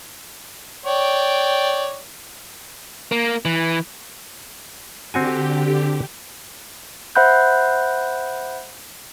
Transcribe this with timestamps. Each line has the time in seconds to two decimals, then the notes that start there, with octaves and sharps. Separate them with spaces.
0.86 C#5 D5 G5
3.12 A#3
3.45 E3
5.14 D3 C4 F#4 G4 G#5
7.15 C5 E5 F#5 B5 F#6 G6